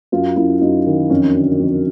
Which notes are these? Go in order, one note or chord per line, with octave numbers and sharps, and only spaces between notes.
F#2 F4
F#2 E4
F#2 D#4
D#3
F2 C#4
D3
F2